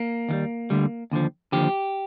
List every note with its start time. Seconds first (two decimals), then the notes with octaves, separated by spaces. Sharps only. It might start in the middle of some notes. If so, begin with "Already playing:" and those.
Already playing: A#3
0.29 D#2 D#3 G3
0.70 D2 D3 G3
1.11 D#2 D3 F3
1.52 D#2 D3 F3 G4